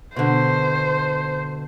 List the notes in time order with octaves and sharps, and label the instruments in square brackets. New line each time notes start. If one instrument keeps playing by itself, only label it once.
[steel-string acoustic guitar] B2 D3 [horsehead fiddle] C5